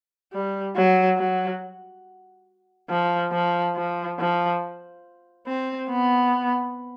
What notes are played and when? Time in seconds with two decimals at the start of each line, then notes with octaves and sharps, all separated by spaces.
0.33 G3
0.76 F#3
1.18 F#3
2.90 F3
3.32 F3
3.76 F3
4.19 F3
5.47 C4
5.90 B3